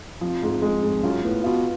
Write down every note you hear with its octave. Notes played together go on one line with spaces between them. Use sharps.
F2 F3
G#2
G#3
G#2
F#2 F4
A2 B3
B2 F4